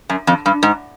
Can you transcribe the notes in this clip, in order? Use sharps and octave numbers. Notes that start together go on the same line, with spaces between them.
F#2
F2
G2
G#2